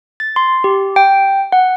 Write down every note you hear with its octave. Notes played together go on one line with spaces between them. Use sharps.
A6
C6
G4
G5
F#5